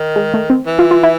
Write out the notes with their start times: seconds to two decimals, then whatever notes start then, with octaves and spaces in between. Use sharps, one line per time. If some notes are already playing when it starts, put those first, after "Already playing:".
Already playing: D#3
0.16 G#3
0.34 A3
0.50 C4
0.66 E3
0.79 F4
0.91 F4
1.03 E4